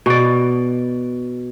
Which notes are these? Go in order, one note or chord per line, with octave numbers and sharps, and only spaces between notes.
B2 D5